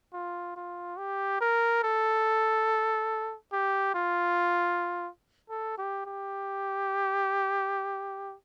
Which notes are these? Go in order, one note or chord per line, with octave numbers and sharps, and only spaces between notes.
F4
F4
G4
A#4
A4
G4
F4
A4
G4
G4